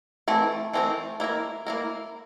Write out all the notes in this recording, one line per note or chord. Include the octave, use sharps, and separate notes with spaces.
E3 A3 C4 E4 A#4
E3 A3 C4 E4 A#4
A#3 E4 A#4
A#3 E4 A#4